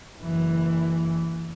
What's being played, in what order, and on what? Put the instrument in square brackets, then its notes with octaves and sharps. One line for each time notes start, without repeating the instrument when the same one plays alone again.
[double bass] F#1 E3